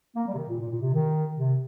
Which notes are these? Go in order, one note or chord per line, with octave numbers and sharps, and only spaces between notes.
A#3
G3
C3
D#3
A#2
A#2
A#2
C3
D#3
C3